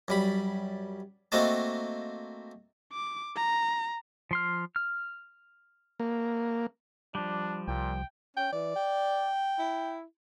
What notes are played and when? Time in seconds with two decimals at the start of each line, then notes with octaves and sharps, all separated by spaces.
0.08 F#2 G3 B5
1.32 A3 A#3 C4 F#4 D#5 A5
2.93 D6
3.36 A#5
4.31 F3 C6 F6
4.76 F6
6.00 A#3
7.15 F3 G3 D4
7.68 C2 A#2 G5
8.37 C#4 G5
8.52 E3 D5
8.76 G5
9.58 E4